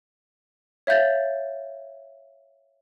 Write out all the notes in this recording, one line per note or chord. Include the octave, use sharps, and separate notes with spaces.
C#5 E5 F5 G6 A6